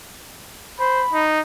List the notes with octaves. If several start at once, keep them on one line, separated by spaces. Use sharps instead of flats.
C5 B5
D#4